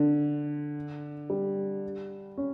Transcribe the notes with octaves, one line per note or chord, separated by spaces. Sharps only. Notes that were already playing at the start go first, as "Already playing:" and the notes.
Already playing: D3
G3
C#4